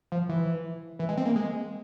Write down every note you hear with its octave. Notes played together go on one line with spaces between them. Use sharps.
F3
E3
E3
G#3
C4
A#3
G#3